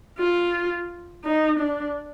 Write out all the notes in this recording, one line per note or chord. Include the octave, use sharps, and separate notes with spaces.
F4
D#4
D4